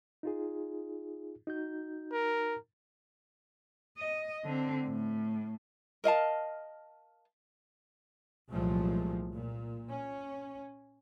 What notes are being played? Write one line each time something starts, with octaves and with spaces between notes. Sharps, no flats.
D#4 F4 G#4
D#4 F#4 G6
A#4
D#5
D3 C4
A2
A#4 D#5 F5 A5
C2 A#2 F3 F#3 G#3 A3
A#2
C#4